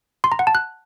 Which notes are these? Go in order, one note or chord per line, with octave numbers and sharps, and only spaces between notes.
C6
A#5
F#5
A5
F#6